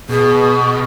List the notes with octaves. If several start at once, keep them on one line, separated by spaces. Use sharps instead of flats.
B2 G#4